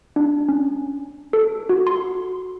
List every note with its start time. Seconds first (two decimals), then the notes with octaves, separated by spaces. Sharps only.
0.16 D4
0.49 C#4
1.33 A4
1.69 F#4
1.87 C6